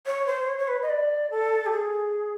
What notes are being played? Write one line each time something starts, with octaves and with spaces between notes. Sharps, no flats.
C#5
C5
C#5
C#5
B4
D#5
D5
A4
G4
G#4